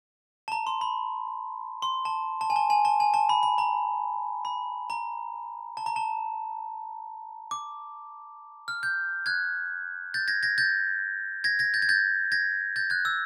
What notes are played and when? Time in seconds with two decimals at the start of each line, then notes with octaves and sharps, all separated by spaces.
0.48 A5
0.52 A#5
0.67 C6
0.81 B5
1.82 C6
2.05 A5
2.41 A5
2.50 G#5
2.56 A5
2.70 G#5
2.85 A5
3.00 G#5
3.14 A5
3.29 B5
3.43 B5
3.58 A#5
4.45 B5
4.90 A#5
5.77 A5
5.86 A#5
5.96 A5
7.51 D6
8.68 F6
8.83 G6
9.26 F#6 G#6
10.14 G6 A6
10.28 G#6 A#6
10.43 G#6 A#6
10.58 G6 A6
11.44 G#6 A#6
11.59 G#6 A#6
11.74 G6 A6
11.82 G#6
11.89 G6 A6
12.32 G#6 A#6
12.76 G6 A6
12.90 F#6 G#6
13.05 E6